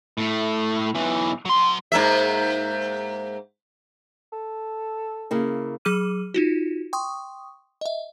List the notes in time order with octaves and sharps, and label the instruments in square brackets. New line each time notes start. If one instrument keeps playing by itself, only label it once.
[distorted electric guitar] A2 A3
B1 E3
F#3 C6
[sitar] G#2 A#3 E5
[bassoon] A4
[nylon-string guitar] C#3 A#3 E4
[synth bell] F#3 G#4 D6 F6 D#7
D#4 F4 F#4
G5 C6 C#6 D#6
D#5 E5